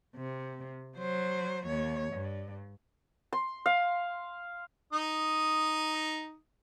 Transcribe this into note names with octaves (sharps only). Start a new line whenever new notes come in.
C3
F#3 C5
D#2 C#5
G2
C6
F5
D#4 D#6